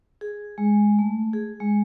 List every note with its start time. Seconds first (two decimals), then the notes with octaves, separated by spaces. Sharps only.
0.21 G#4
0.58 G#3
0.99 A3
1.33 G#4
1.60 G#3